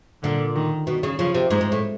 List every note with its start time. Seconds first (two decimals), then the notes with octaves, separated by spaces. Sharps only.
0.23 A#2 D3
0.56 D#3
0.87 B2
1.03 C#3
1.19 C#3 F3
1.35 C3
1.51 G#2 G#3
1.61 G#2
1.72 A2